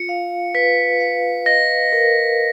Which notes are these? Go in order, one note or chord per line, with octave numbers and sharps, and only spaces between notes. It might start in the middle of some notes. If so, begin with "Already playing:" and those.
Already playing: F4 C#7
F5
B4 B6
F5
D#5 A#6
A#4